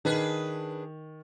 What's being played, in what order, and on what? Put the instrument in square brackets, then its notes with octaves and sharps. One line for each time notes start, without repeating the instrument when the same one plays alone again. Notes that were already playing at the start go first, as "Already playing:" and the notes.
[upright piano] D#3 [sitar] D4 G#4 B4